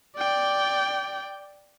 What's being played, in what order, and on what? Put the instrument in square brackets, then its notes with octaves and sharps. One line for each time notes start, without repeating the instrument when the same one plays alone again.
[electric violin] D5 G5